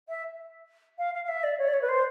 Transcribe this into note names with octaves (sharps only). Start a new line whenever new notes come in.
E5
F5
F5
F5
E5
D5
C#5
D5
C#5
B4
C5